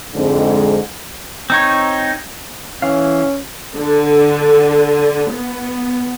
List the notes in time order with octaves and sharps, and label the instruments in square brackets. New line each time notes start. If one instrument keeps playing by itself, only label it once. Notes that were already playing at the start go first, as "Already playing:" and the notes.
[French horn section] F2 G#2 D3 G#3 C4
[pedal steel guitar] C4 D#4 C#5
[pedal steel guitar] E3 F5 [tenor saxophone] C#4
[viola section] D3
B3